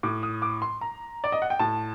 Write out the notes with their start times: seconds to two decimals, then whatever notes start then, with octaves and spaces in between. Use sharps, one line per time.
0.03 A2 D6
0.23 D#6
0.42 D6
0.62 C6
0.81 A#5
1.24 D5
1.32 D#5
1.42 F#5
1.50 G5
1.59 A2 A5